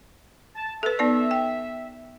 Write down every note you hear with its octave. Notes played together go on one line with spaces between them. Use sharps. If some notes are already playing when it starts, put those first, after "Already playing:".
A5
A4 B4 E5
B3 D#4 D5
G5